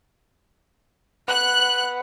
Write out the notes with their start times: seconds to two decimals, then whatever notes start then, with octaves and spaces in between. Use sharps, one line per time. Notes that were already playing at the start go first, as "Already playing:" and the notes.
1.28 B4 F#5 F#6